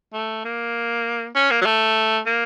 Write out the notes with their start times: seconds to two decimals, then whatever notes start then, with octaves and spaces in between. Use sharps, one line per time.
0.14 A3
0.45 A#3
1.36 C#4
1.51 A#3
1.62 F#3
1.65 A3
2.26 A#3